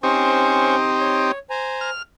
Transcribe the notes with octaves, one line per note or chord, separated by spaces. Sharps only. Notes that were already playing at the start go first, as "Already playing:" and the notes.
C4 C#4 D#4 G4 C5 C#6
C#5
C5 G#5 A#5
F6